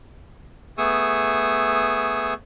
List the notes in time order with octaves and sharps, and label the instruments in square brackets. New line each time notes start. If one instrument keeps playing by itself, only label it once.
[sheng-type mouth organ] A3 B3 G#4 C#6 D#6 E6